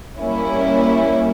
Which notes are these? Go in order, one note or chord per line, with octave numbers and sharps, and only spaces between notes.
G3 A#3 C#4 E4